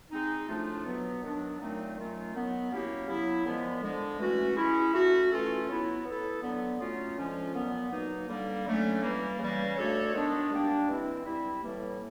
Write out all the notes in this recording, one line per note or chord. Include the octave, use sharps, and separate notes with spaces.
G#3 C4 D#4
A2 F3 A3 D4 F4
B2 F#3 B3
D#3 F#3 B3 D4
A#2 F#3 A3 C4 D#4
D#3 F#3 A3 C#4 F4
D#3 F#3 B3
F#3 A#3 C#4 E4 G4
C#3 F#3 B3 E4
A#2 F3 G#3 B3
D3 F3 G#3
E3 A3 C#4 F#4
G#3 C#4 E4
A3 C#4 F#4
E3 A3 C#4 F4 A4
F#3 B3 E4
B3 E4 A4
D3 F#3 B3
F#3 A3 C#4 F4
D3 F3 G#3 C#4 F4
A#2 F#3 B3
B2 F#3 A#3 D#4
D3 G3 A#3
D3 F#3 A3 C#4
E3 G3 A#3
C#3 E3 G3 A#3
A3 D4 F#4 A4 C#5
D#3 G#3 B3 D4
G3 A#3 D4 G4
E3 G#3 C4 E4
G3 C4 E4
A2 E3 G3 A#3